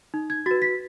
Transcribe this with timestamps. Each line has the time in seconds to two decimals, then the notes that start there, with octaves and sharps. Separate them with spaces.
0.14 D#4
0.30 G#6
0.46 F#4 B4 A6
0.62 B6